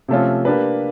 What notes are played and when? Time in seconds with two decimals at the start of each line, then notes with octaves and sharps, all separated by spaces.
0.08 C3 F3 A3 C#4 F4
0.45 A#3 D4 G4 B4